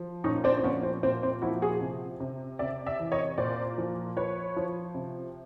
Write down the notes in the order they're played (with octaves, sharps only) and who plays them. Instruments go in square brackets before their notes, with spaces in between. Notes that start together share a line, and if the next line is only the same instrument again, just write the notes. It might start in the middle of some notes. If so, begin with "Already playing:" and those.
Already playing: [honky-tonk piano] F3
A#2 C#4 D#4
C4 D4
C4
F3 B3 C#4
C4
A#2 C4
C4
F3 E4 F#4
F#4 G#4
C3
C3
C3 D5 E5
D5 E5
E3
C#5 D#5
A#2 C5 D5
F3
F3 B4 C#5
F3
C3